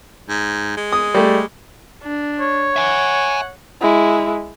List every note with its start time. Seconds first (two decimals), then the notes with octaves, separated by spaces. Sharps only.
0.29 G#2
0.77 G#3
0.92 D#6
1.14 G3 A3
2.03 D4
2.40 C#5
2.76 E5 F#5 G#5
3.82 G#3 E4